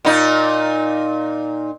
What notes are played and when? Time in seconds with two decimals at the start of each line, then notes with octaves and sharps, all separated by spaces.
0.05 A#2 D#4